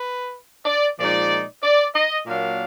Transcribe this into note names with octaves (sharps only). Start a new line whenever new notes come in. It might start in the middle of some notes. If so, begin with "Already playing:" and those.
Already playing: B4
D5
A#2 F3 G#3 D#4 D5
D5
D#5
A#2 F#3 A#3 D4 F5